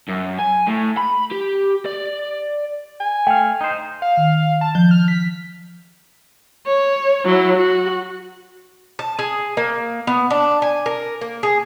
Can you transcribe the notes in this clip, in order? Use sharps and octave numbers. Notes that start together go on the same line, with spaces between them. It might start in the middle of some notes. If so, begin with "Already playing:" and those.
F#2
G#5
A2
B5
G4
D5
G#5
A3 F5 G5
D#4 C5
F5
D#3
A5
F3 G6
F6
B6
C#5
F#3 E4
F#4
A5
G#4
A#3
B3
D4
G#5
A#4
A#3
G#4